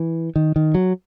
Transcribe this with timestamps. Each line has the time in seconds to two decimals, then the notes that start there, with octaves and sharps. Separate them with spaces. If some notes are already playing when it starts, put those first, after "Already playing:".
Already playing: E3
0.36 D#3
0.56 D#3
0.74 F#3